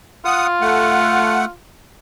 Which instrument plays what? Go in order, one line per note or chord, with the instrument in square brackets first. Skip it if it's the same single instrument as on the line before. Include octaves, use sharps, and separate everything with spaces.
[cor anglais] F4 [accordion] F#5 D#6
[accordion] A3 F#5